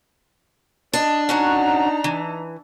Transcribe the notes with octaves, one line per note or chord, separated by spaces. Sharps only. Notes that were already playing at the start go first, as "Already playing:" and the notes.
D4 D#5
C#4 D#4 F#4 F#5 A#5
E3